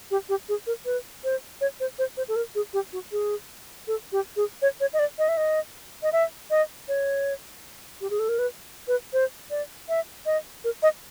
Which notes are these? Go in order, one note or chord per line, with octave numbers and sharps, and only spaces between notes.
G4
G4
G#4
A#4
B4
C5
C#5
C5
C5
C5
A4
A#4
G#4
G4
F#4
G#4
A4
G4
G#4
C#5
C#5
D#5
D5
D#5
E5
D#5
D#5
E5
D#5
C#5
G4
G#4
A4
A#4
B4
B4
C5
D5
E5
D#5
A#4
D#5